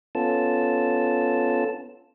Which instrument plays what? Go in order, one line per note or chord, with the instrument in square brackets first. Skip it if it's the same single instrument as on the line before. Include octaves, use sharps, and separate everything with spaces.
[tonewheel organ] B3 C#4 F4 A4 A5